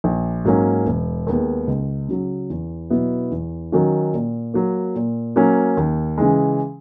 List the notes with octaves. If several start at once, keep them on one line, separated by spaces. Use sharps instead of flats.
A#1
G#2 F#3 A#3 C#4
E1
D#2 D#3 G#3 B3
C#2
C#3 F#3
E2
B2 F#3 B3 E4
E2
D#3 F#3 C#4 F#4
A#2
F#3 A#3
A#2
F#3 A#3 C#4
D#2
C#3 E3 G#3